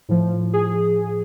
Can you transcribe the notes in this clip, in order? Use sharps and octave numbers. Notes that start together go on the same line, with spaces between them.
A2 F3
G#4